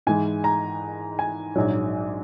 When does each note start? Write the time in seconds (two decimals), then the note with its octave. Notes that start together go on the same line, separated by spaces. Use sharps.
0.07 G#2 E3 G#3 G#5
0.44 A#5
1.19 G#5
1.56 A#1 G#2 F#3